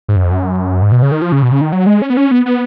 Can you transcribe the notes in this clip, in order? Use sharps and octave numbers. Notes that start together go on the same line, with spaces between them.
G#2
F#2
F2
F#2
G#2
B2
C#3
D#3
F3
C#3
B2
C#3
D#3
F#3
G#3
C#4
B3
C#4
B3
B3